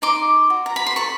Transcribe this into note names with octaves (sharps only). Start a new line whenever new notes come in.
D#4 C6 D6
F#4
A#5
B5
C6
A4 B5 C#6